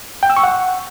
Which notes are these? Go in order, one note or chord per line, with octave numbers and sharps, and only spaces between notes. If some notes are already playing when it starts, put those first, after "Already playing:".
G5
E6
C#6
F#5